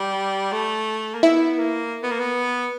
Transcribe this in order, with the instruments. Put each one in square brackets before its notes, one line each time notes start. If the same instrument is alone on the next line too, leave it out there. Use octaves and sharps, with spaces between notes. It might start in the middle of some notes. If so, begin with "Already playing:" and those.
Already playing: [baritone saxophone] G3
A3
A#3
[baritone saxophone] B3 [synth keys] E4 E5
[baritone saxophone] A#3
B3
A#3
B3